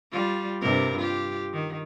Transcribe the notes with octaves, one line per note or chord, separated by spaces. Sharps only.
G3 F4
G2 C3 A#4
F4 G4
D#3